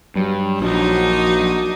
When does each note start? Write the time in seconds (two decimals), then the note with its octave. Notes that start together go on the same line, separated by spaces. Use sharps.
0.15 G2 F#3
0.60 A#1 D4 D#4 F#4